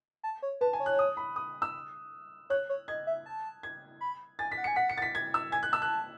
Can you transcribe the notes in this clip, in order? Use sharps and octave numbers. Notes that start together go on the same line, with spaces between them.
A5
C#5
B4 A5
G#5
C#5
F#6
D#6
B5
D#6
E6
C#5 F#6
C#5
D#5 G#6
E5
A5
G#6
B5
G#5 A6
B6
F#5
C#7
G#5
F#5 B6
C#7
A6
B6
G#6
E6
G#5 G#6
F#6
A5 E6
F#6